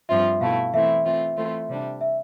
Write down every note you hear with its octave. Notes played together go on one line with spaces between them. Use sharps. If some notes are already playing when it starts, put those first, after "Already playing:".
G2 F3 C4 F4 E5
B2 A3 E4 F5
E3 A3 C4 E4 E5
E3 A3 C4 F4 E5
E3 A3 C4 F4
C3 G3 D4
E5